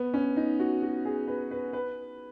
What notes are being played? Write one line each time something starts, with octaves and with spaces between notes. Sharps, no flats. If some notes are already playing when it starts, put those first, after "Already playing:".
Already playing: B3
C#4
D#4
F#4
F#4
G#4
B4
B4
B4